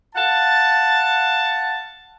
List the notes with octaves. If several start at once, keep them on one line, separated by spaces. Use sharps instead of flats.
F5 F#5 A5